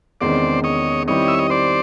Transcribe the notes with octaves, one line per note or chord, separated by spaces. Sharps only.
E2 C3 D#3 G#3 C#4 C5 D5
C#5 D#5
D#3 G3 C4 E4 G4 C#5 D#5
E5
D#5
C5 D5